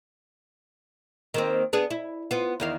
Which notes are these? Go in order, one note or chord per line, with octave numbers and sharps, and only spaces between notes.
D#3 A#3 C4
B3 D4 G#4
E4
B3 F4
E2 D#3 F5